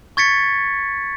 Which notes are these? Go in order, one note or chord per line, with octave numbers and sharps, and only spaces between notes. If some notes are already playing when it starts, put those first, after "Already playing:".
C#6 G#6 A6 B6 C#7